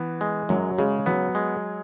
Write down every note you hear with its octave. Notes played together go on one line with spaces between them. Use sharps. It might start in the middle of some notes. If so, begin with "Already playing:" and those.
Already playing: E3 B3
G#3
F#2 F#3
C#3 G#3
F#3 B3
G#3